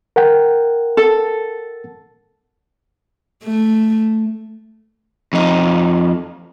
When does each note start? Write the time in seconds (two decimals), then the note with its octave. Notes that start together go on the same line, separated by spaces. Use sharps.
0.16 A#4 F#5 G5
0.97 A4
3.44 A3
5.33 F2 D#4